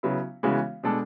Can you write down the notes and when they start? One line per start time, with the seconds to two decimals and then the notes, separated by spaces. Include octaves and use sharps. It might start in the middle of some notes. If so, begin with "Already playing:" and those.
0.03 C#3 F#3 B3 E4
0.43 C#3 E3 G#3 B3 F#4
0.83 B2 G#3 D4 A4